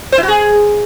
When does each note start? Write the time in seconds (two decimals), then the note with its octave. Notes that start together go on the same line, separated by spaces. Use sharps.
0.12 C5
0.18 E4
0.23 F#4
0.28 G#4